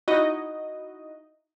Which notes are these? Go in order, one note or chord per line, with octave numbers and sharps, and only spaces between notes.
D#4 E4 F#4 D#5